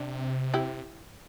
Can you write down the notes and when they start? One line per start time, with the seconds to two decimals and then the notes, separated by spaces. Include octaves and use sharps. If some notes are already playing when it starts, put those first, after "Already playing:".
Already playing: C3 D4
0.54 E4 G4